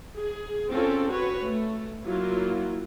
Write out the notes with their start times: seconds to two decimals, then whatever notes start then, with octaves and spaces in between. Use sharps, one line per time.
0.16 G#4
0.70 C4 C#4 F4 A4
1.11 F#4 B4 C#5
1.42 A3
2.04 F#3 A#3 E4 F4